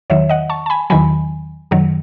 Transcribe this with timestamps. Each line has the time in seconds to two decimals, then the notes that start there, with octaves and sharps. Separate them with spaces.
0.10 E2 D#3 F#3 C#5 E5
0.29 D#5 F#5
0.50 A5 C#6
0.66 A5
0.70 G#5 B5
0.90 E2 D#3 F#3 G#5 B5
1.71 F#2 D#3 F#3